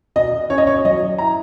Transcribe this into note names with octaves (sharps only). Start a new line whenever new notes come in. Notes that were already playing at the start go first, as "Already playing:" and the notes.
B2 D#5
C#4 C#5
D#5
C#5
F#3 D#5
E4 A#5